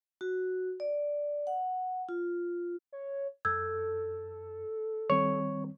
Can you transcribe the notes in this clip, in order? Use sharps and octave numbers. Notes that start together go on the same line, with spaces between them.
F#4
D5
F#5
F4
C#5
F#2 A4 E6 G6 G#6
D#3 G3 C4 C#5